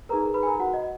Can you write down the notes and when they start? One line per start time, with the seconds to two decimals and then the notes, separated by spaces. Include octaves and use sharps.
0.09 D#4 G#4 A#4 B4 A#5
0.34 B4 B5
0.43 G#5
0.47 A#4 A#5
0.60 F#4 F#5
0.74 D#5